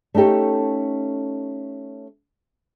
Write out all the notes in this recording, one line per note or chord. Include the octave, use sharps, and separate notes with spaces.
A3 C#4 D#4 G4 A4